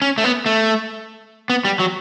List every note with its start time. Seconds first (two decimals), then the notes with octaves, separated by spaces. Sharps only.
0.02 C#4
0.18 A3
0.24 B3
0.46 A3
1.50 B3
1.65 G3
1.79 F#3